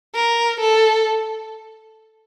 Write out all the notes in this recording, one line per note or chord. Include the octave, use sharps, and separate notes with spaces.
A#4
A4